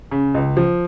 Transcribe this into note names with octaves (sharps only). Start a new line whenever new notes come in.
C#3
C#2
F3